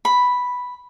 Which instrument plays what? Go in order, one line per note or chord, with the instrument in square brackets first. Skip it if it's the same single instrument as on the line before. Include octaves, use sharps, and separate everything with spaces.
[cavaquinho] B5